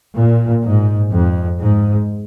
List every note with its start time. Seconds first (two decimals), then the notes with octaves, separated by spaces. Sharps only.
0.18 A#2
0.65 G#2
1.11 F2
1.59 G#2